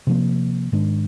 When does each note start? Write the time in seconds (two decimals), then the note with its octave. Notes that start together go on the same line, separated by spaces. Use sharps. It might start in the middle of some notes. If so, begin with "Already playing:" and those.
0.07 C3 F3 A#3
0.72 G#2 D#3 G#3 D4